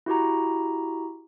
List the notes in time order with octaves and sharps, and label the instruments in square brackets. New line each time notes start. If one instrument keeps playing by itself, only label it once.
[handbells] E4 F#4 G4 A#5